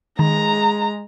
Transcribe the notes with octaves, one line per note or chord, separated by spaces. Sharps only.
D#3 G#3 A#5